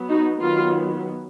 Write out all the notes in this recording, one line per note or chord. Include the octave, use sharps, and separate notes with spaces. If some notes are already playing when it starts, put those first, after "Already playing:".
Already playing: F#3 B3
D#4 F#4
D#3 F#3 B3 F4